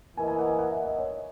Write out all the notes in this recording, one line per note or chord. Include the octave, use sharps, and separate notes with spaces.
E3 A#3 E4 A#4 D#5 G#5
G#5
F#5
G#5
F#5
E5
D#5
C#5